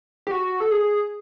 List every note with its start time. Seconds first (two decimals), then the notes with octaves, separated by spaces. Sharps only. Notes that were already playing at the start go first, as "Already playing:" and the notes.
0.27 G4
0.31 F#4
0.60 A4
0.71 G#4